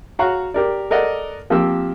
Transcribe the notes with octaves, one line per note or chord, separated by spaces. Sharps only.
F#4 C#5 F5 A#5 C#6 F#6
G4 A#4 D5
A4 A#4 D5 D#5 F#5
F3 A#3 C4 G4 E6